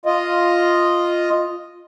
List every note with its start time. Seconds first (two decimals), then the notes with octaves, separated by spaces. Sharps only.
0.06 F4 D#5